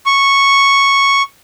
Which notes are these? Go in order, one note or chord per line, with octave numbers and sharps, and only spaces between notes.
C#6